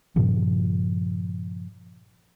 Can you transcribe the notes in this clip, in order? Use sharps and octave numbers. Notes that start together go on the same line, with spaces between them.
G2 A#2 C#3 F3